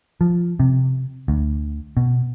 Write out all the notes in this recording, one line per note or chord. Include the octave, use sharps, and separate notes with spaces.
F3
C3
D2
B2